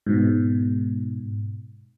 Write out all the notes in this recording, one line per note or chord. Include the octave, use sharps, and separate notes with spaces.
G#2 B2